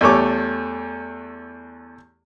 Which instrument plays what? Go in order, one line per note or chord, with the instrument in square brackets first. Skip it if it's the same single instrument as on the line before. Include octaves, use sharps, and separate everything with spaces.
[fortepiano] E2 G3 A3 C#5 D6